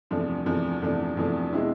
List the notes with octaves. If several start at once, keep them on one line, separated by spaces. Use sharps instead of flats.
E2 C3 F3 A3 D4
E2 C3 F3 A3 D4
E2 C3 F3 A3 D4
E2 C3 F3 A3 D4
B2 G#3 C4 E4